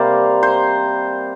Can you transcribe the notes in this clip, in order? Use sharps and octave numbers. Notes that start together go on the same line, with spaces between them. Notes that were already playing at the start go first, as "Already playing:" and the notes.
Already playing: C3 G3 A#3 A#4 C5 D5
C5